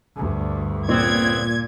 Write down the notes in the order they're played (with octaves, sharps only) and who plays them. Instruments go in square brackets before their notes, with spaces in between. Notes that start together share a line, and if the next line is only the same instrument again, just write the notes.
[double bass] D2 G2
[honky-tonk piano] A#2 [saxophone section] C#3 B3 C4 [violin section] G#6